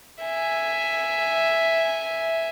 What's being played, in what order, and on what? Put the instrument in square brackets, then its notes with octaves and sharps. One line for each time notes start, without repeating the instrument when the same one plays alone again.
[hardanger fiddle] E5 G#5